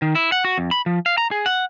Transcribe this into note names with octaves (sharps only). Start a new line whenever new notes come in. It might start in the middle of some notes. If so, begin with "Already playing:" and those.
D#3
E4
F#5
F#4
F2
B5
F3
F5
A#5
G#4
F#5